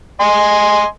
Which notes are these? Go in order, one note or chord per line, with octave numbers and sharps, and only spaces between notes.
D#5 G#5 C6